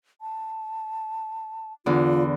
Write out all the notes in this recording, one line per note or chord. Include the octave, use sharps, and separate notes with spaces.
A5
E2 D3 F4